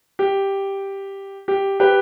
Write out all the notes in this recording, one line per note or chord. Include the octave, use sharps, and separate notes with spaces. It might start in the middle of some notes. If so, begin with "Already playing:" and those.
G4
G4
G4 B4